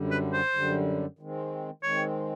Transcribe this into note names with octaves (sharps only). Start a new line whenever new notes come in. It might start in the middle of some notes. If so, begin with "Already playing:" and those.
Already playing: F#2 D3 G3
B4
C5
F#2 D3 G3
D#3 G#3 C4
D#3 G#3 C4 C#5